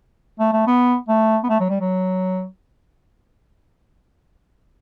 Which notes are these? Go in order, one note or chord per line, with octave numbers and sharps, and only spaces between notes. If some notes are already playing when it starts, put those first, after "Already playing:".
A3
A3
B3
A3
B3
A3
F#3
G3
F#3